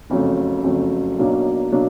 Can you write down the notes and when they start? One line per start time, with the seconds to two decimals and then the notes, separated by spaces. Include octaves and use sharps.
0.10 F#1 F2 C#3 F#3 A3
0.64 F#1 F2 C#3 F#3 A3
1.18 B1 B2 F#3 A#3 D4
1.72 B2 F#3 A#3 D4